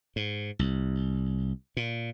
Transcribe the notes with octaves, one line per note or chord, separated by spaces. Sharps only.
G#2
C2
A#2